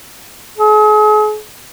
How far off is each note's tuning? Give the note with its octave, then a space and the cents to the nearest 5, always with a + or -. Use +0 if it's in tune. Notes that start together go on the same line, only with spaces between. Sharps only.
G#4 +40